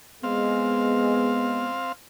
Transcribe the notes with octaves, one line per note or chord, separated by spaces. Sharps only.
G#3 B3 C4 F5